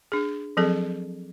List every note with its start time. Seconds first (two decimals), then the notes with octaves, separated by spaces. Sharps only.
0.12 D4 G#4
0.57 F3 F#3 C4 G#4 A4